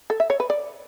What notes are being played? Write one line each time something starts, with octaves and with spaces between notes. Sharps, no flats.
A4
E5
C#5
B4
D5